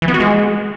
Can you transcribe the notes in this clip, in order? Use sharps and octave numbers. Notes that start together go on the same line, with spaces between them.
E3
B3
F#4
G#3